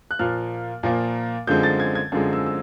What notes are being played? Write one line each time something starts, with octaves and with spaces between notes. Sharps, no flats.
F#6
A#2 F3 A#3 F6
A#2 F3 A#3
F#2 D3 F3 G#3 C4 G6
A6
G#6
G#6
F#2 D3 F3 G#3 C4
E6
E6